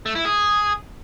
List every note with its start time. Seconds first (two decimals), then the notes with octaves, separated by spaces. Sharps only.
0.06 A3
0.15 E4
0.25 G#4